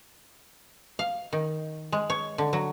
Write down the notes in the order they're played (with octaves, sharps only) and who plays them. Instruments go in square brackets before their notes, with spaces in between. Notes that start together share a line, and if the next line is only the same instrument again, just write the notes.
[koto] F5
D#3
G#3
C#5
D3
F#3